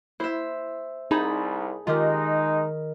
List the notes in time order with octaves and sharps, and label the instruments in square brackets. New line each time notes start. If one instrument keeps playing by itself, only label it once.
[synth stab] E4 [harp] C5 E5
[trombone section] C2 [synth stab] D#4 [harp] G#4 A5 B5
[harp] D#3 A#4 [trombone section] G#3 D#4 [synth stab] F4 G4